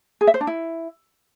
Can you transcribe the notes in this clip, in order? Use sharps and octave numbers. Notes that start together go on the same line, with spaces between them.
G#4
E5
C5
D4
E4